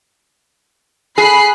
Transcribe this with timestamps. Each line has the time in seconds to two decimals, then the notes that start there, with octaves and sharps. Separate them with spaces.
1.18 G#4 B5 F#6 C7